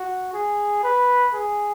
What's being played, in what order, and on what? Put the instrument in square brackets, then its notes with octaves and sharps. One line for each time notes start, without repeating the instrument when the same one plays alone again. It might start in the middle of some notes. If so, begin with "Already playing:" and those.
Already playing: [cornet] F#4
G#4
B4
G#4